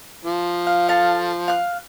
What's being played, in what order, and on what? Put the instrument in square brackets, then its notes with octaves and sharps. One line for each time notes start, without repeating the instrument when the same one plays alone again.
[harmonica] F3
[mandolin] F5
A4 F5 A5
F5 F#6